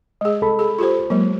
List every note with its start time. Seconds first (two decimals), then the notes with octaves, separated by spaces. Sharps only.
0.21 G#3 G#4 D#5
0.42 C2 A4 B5
0.59 G#4
0.78 F4 G4 C5
1.10 F#3 G#3 A#3